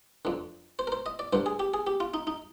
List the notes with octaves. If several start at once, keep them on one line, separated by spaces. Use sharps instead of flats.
F2 D3
C5
A#4
C5
D#5
D5
G2 D3 C5
G#4
G4
G#4
G4
F4
D#4
D#4